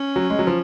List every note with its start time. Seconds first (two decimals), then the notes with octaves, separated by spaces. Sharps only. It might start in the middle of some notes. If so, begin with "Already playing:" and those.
Already playing: C#4
0.16 F#3
0.30 G#3
0.39 F#3
0.47 F3